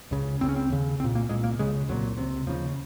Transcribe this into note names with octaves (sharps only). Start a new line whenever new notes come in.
C#2 C#3
C#2 C#3 C4
C#4
C4
D#2 C#3
C2 A#2 C4
A#3
C2 A#2 G#3
A#3
C#2 C#3 G#3
C2 A#2 F#3
C#2 C3
D#2 C#3 F3